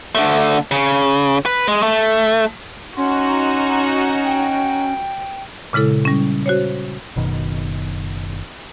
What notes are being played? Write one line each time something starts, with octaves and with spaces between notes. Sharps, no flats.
D3 A3
C#3
B4
G#3
A3
C#4 D#4 F#4 C6
G5
A#2 C#3 G#3 E4 A4
G3 C#4
F#4 C5 C#5
F#1 B2 D#3